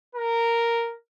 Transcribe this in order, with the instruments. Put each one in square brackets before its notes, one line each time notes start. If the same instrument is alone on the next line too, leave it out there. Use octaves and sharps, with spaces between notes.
[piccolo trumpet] A#4